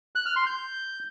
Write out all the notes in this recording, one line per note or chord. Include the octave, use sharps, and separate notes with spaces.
F#6
F6
C6
G6